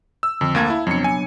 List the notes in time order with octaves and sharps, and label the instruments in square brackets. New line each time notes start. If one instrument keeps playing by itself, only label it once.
[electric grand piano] E6
[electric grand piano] F2 [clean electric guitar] D3
[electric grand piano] D2 A#3 G#6 [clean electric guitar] F5 A5
[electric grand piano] E4
[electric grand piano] F2 C#7 [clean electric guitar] F#3 B3 D4
[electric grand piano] G#5